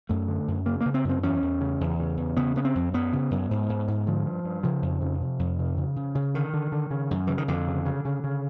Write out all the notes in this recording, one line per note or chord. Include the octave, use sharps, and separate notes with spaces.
F#2 A3
D3
F#2
C#3 A#3
C#3 A#3
C4
F#2 C4
E2 C#4
E2
C#3
E2
C#3
E2
C#3 B3
C#3 B3
C4
F2
F#2 B3
C#3
F#2
G#2
G#2
G#2
D3 F3
G2
G2
C#3 F3
F2
C#3
C3
F2
C3
C#3
C#3
C#3
D3 D#3
D3
D3
C#3
F#2
C#3 E3
D#3
F2 D3
C#3
C#3
C#3
C#3